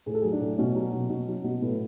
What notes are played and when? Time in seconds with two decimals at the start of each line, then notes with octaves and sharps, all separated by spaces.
0.06 A2 G#4
0.14 A4
0.22 F#3 G#4
0.32 D4
0.41 A2
0.58 B2 C#4
0.75 F#3
0.93 B2
1.09 B2
1.28 F#3
1.44 B2
1.62 A2 B3